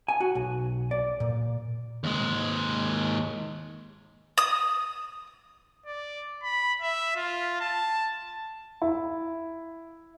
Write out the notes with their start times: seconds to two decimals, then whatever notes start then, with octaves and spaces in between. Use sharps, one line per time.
0.09 G#5
0.21 F#4
0.35 B1
0.91 D5
1.20 A#2
2.04 D#2 G#3
4.38 D#6
5.86 D5
6.43 B5
6.82 E5
7.16 F4
7.60 A5
8.82 E4